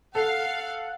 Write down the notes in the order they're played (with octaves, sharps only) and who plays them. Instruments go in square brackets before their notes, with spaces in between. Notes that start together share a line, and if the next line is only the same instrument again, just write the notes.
[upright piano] A4 [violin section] F5 [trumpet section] F#5